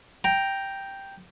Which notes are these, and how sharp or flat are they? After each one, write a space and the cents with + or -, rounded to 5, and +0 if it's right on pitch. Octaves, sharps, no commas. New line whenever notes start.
G5 +0 A#5 +0